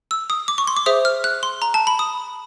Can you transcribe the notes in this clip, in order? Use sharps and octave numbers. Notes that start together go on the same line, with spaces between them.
E6
D#6
D6
C#6
C6
D6
G#4 C5 E5 D#6
F6
F#6
C6
A#5
A5
B5
D#6